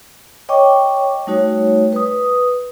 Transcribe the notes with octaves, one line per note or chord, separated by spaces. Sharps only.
C#5 D#5 G5 C#6 D6
G3 A3 D#4 F#4 C#5
B4 D#6